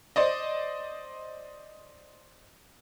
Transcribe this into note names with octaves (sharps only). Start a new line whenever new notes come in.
C5 D5 D#5